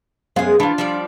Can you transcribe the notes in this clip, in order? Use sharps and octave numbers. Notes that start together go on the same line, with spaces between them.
F#2 G#3 B3 G#4 F5
E3 D4 F4
F3 G3 D5